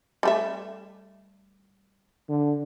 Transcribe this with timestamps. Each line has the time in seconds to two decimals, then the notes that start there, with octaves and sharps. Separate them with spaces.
0.23 G3 A3 E5
2.29 D3